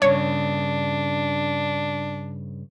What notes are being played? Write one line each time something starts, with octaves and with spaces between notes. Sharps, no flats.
G2 A#2 C#3 D4 C#5